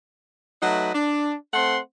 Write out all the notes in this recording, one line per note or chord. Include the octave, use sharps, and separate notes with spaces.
F#3 A3 D#4 B4
D4
A3 C4 F#5 C6